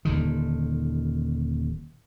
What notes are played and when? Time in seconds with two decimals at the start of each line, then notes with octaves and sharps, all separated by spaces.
0.05 D#1 D3 D#3